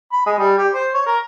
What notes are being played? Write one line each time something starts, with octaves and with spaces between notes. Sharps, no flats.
B5
G#3
G3
G4
C5
C#5
A#4